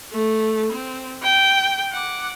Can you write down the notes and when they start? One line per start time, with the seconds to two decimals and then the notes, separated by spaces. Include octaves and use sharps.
0.12 A3
0.72 C4
1.23 G5
1.92 F#5 D6